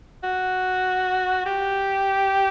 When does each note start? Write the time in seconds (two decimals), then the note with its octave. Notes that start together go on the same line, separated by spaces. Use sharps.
0.24 F#4
1.46 G4